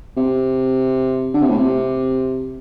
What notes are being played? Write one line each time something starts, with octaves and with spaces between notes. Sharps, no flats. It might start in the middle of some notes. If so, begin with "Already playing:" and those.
C3
D3
C3
A2
C3